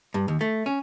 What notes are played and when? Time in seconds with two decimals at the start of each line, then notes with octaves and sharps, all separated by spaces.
0.14 G2
0.28 D#2
0.41 A3
0.66 C#4